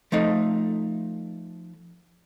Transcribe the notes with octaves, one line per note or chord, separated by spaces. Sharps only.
F3 A3 D#4 F5